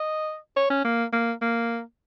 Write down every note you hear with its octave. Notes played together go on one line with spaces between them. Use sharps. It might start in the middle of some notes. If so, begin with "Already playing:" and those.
Already playing: D#5
C#5
C#4
A#3
A#3
A#3